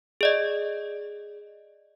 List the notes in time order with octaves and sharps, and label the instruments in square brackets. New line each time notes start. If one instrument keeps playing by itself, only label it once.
[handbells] G#4 D5 D#5